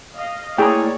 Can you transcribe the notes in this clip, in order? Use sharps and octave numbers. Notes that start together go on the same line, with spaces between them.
D#5 F5
A2 A#3 E4 G#4 C#5 D5 G5 A#5